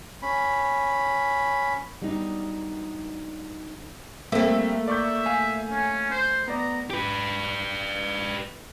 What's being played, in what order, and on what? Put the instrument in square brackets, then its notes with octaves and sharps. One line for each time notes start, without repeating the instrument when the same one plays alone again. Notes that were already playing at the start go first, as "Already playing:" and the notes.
[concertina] C#4 B5
[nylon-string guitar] F#3 G3 B3 D4 D#4
[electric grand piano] G3 C4 E5 [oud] A3 A#3
[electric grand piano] D5 C#6 G6 [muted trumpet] E5
[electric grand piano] F5 G#5
[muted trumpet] C#4
C5
[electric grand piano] B3 D5 [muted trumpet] A#5
[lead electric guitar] G4 B4